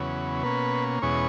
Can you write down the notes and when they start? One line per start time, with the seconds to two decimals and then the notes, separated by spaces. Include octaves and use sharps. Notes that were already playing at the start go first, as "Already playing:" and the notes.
Already playing: E2 C#3 F#3 B3
0.43 B2 A#3 C#4 B4
1.02 E2 B2 G#3 C#4 C#5